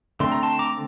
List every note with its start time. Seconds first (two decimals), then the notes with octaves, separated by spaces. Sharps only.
0.20 D3 A3 C4 C6
0.32 A#5
0.43 A5 C6
0.59 A#5 D6